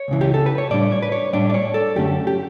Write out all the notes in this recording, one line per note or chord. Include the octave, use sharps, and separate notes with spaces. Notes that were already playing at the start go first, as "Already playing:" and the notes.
Already playing: C#5
C#2 C#3 E3
G4
A4
B4
C#5
A2 G3 D4 D5
C#5
B4
C#5
A2 G3 D4 D5
D5
C#5
A4
F#2 D3 A3 C#4 G4
G4